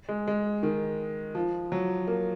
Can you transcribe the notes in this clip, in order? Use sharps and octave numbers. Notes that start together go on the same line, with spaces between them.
G#3
G#3
D#3
F3
F#3
A#3